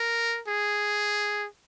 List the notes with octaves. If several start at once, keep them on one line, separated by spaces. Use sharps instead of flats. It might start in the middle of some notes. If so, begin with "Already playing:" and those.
Already playing: A#4
G#4